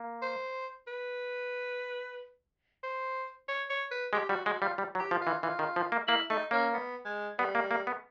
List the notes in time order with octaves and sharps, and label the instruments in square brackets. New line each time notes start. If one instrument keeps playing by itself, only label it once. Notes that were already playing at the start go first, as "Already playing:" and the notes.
Already playing: [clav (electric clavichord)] A#3
[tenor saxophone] C5
B4
C5
C#5
C#5
B4
[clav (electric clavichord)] G#3 [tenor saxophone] G4
[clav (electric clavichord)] G3 [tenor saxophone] F#4
[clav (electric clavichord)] G#3 [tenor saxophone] F#4
[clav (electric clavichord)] G3 [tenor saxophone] F4
[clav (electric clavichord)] G3
F#3
[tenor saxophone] G4
[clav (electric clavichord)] F3
[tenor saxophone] F4
[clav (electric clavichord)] E3
[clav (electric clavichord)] E3 [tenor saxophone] F4
[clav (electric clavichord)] D#3
F3
A#3
[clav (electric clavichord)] A#3 [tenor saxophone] E4
[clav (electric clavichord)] A3 [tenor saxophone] D#4
[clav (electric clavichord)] A#3 [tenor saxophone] C#4
[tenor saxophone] B3
G#3
[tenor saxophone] G3 [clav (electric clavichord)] B3
[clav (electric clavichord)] A#3
A#3
B3